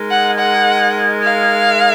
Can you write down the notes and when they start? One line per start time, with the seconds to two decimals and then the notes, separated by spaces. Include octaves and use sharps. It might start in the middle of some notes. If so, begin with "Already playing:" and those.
Already playing: G#3 D#4 A#4
0.11 F#5
0.39 F#5
1.23 F5